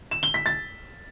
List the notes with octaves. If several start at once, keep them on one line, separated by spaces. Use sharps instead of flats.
E7
G7
B6
A6